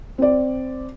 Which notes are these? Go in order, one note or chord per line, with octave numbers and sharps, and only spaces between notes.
C4 D5